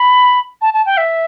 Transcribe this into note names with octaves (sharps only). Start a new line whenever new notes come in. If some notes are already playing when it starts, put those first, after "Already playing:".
Already playing: B5
A5
A5
G5
E5